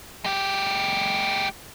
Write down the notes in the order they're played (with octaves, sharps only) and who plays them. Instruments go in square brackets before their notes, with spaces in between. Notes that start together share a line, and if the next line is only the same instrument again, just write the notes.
[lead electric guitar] G#3 G4